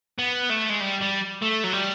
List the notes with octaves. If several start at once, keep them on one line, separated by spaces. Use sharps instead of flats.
B3
A3
G#3
G3
G3
A3
F#3
G3